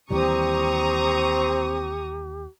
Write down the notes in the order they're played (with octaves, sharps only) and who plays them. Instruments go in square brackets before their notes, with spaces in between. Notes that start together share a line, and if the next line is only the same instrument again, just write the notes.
[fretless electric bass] D#2 E3 G3 [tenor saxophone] C4 [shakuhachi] G4 [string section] A#5 C#6 D#6